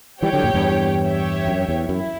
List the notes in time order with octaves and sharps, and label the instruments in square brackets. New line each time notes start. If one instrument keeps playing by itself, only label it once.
[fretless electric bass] E3 G3 [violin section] G4 C#5 G5
[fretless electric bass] D3 F#3
F#2 A#2
E2 G2
[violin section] G4 C#5 E5 G5
[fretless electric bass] F#2
E2
[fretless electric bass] F#2 [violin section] E4